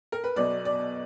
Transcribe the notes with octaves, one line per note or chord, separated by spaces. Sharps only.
A#4
B4
B1 B2 F#3 B3 D5
D5